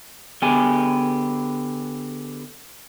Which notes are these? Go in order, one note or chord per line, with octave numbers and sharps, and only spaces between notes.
D3 B3 G4 G#4 G#5